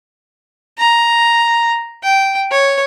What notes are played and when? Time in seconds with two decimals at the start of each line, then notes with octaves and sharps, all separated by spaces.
0.78 A#5
2.03 G5
2.51 C#5